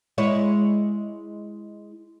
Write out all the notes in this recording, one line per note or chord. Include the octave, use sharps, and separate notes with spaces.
G#3 E4 C#5